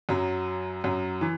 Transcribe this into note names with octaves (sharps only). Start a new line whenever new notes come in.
F#2 F#3
F#2 F#3
E3